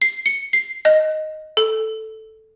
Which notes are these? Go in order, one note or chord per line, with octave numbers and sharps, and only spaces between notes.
C7
C#7
C7
D#5
A4